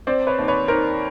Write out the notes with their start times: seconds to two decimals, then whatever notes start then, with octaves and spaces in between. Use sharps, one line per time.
0.07 C4 C5 D5
0.27 B4 C#5
0.38 D#2
0.48 B4 C#5
0.68 D#3 A#4 C5